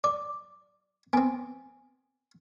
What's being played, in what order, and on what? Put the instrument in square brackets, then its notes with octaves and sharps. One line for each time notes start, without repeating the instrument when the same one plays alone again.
[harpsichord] D5 [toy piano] D6
[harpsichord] B3 C4 [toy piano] G#5